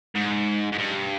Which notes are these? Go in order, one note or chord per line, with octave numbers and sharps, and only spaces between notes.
G#2
G#2
G2